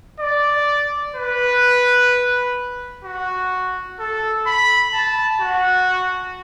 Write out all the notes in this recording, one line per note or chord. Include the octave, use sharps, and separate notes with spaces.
D5
B4
F#4
A4
B5
A5
F#4